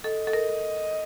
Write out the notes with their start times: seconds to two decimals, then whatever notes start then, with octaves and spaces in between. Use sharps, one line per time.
0.04 A4 D#5
0.27 A4
0.33 A#4